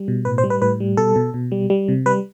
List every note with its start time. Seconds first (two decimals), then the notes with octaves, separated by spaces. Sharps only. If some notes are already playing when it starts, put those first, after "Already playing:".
Already playing: G3
0.08 B2
0.25 A2 B4
0.38 C5
0.44 G3
0.50 B4
0.62 A2 B4
0.80 G3
0.97 B2 A4
1.16 B2
1.34 B2
1.52 G3
1.70 G3
1.88 C3
2.06 G3 B4